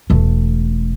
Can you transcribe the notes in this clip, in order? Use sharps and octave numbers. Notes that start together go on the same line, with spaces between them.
E1 A3